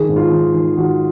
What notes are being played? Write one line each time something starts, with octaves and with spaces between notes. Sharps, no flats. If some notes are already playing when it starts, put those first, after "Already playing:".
Already playing: D#3 G#4
G#2
F4
D#3
D#3
D#3 F#4